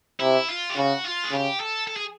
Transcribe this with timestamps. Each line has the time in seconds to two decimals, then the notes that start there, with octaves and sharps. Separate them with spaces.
0.20 C3 E4
0.49 F4
0.70 G4
0.76 C#3 F#4
1.04 F4
1.24 G#4
1.31 C#3 G4
1.60 A4
1.87 A4
1.96 G#4